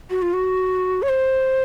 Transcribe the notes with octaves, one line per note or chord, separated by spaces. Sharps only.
F#4
F4
F#4
C#5
C5